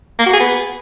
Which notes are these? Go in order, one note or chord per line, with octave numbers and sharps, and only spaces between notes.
A#3
F#4
G#4
B3